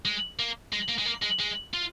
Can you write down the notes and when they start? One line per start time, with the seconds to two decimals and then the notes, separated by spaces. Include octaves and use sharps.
0.05 G#3
0.39 A#3
0.73 G#3
0.89 A#3
0.99 G#3
1.06 A#3
1.23 G#3
1.40 G#3
1.74 F4